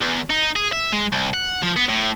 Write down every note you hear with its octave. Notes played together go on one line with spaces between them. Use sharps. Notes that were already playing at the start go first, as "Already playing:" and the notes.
E2
D#4
G#4
E5
G#3
C2
F#5
F3
B3
A2